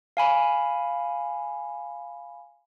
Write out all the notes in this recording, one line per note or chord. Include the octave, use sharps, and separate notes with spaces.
F5 G#5 B5